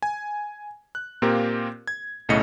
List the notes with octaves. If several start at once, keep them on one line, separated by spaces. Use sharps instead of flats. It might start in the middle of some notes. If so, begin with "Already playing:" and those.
G#5
F#6
A#2 A#3 C4 F4 G4 A#4
G#6
B1 A2 C#3 A3 D#5 C#7